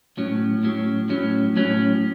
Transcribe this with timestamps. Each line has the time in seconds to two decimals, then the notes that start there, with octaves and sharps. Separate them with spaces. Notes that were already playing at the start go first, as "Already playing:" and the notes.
0.17 A2 F#3 C#4
0.63 A2 F#3 C#4
1.10 A2 F#3 C#4
1.56 A2 F#3 C#4